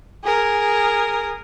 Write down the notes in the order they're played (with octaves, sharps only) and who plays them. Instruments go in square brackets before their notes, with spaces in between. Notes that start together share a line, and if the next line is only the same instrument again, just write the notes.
[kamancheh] G#4 A#4